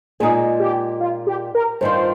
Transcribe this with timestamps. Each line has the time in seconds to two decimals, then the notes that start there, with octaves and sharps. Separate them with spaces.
0.20 A#2 G#3 D#4 G#4
0.60 G4
1.00 F4
1.27 G4
1.55 A#4
1.81 G2 D#3 G3 C4 F4 C5